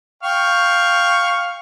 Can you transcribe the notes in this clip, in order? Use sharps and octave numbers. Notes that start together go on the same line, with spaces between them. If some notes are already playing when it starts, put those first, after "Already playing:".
F5 G5 C#6